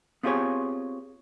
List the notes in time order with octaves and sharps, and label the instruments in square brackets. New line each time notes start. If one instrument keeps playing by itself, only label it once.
[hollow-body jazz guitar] B3 C4 F4 G4 G#4 C#5